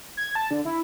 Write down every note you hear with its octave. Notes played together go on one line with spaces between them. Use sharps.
G#6
A5
D3
E4